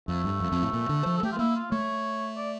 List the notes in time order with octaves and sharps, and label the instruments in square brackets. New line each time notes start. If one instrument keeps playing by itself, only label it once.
[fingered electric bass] F2 [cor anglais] A3
[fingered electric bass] G2
F2
F2
A2
A#2
D3
F3
[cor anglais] A4
[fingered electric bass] A3 [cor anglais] G4
[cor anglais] F4
[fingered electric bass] A#3 [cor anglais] E4
[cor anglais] F4
[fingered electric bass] A3 [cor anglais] C#5
[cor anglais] D5